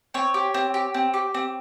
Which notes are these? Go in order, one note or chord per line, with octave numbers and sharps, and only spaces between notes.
C4 C#5
G4
C4
G4
C4
G4
C4